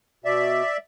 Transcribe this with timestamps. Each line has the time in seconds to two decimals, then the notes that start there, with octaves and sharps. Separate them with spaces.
0.24 B2 D5 E5